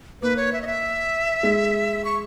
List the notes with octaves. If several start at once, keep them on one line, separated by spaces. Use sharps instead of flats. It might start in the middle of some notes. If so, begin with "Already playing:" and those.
A#3 B4
C#5
E5
D#5
E5
G#3
C#6